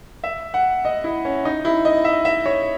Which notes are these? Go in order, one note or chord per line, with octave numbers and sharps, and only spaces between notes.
E5
F#5
D#5
E4
C#4
D#4
E4
D#5
E5
E5
C#5